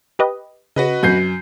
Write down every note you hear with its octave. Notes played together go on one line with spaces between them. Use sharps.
G4 B4 D#5
C#3 F#4 B4 D#5 A#6
F#2 C3 G6 C7